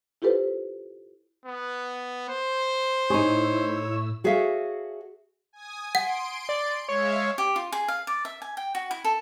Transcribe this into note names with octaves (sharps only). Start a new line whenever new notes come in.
E4 F4 G4 A4 B4 C5
B3
C5
A2 D#4 E4 G#4 C#5 E6
F#4 G#4 A4 C#5 E5 F5
G#5 D#6
F#5 C6 D7
D5
G#3 C#5 E5 F5
G4
F4
G#4
F5
D5
E5
G#5
G5
F#4
E4
A4